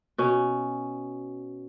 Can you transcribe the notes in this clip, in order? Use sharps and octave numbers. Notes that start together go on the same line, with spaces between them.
B2 C#4